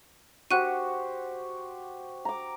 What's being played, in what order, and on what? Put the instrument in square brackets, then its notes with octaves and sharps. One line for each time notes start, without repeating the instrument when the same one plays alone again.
[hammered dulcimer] F#4 G4 C5 [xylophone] F#5 F#6 D#7
[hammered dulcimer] A#5 D6